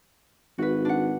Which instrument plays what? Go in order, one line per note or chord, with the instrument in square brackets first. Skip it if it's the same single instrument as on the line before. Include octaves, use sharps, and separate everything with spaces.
[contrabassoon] G#1 [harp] F#4 B4
[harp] D4 F#5